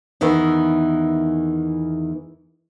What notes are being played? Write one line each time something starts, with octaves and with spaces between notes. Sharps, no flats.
E2 D#3 E3